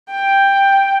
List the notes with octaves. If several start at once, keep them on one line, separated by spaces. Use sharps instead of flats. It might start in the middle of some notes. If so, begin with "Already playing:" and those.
G5